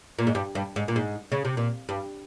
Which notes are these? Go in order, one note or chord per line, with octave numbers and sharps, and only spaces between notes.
A#2
G#2
G2
G2
G#2
A#2
G#2
C#3
C3
A#2
G2